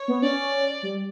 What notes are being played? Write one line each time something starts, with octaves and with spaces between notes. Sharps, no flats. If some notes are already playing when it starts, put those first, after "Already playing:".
Already playing: C#5
B3
C#4 D5
G3